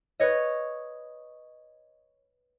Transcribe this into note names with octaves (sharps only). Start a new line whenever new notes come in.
B4 C#5 D#5